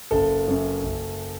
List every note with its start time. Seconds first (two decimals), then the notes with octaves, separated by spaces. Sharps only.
0.11 F#1 A4
0.47 F#2
0.83 F#1